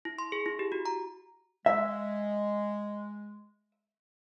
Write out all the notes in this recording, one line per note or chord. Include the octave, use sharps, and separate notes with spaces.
E4
C6
G#4
E4
G4
F#4
A#5
G#3 E5